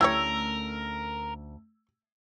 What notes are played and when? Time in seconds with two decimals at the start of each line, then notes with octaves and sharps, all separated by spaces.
0.01 D2 A3 C#4 E4 G4 A#4 C#5 E6